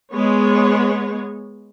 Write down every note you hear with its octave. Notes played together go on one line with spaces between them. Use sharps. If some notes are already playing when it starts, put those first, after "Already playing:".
G#3 B3 C#5